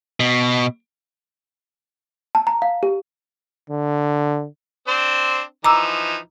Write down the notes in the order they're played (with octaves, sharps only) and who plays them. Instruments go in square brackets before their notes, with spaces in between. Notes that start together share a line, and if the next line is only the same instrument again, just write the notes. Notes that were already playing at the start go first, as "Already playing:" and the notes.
[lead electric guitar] B2
[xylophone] A5
A#5
F5
G4
[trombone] D3
[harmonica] C4 D4 C5
[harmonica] E3 F3 D#4 [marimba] A#5 D6 E6